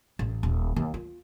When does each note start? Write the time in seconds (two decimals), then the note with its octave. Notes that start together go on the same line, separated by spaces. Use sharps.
0.19 A1
0.43 D#1
0.76 D#2
0.94 F4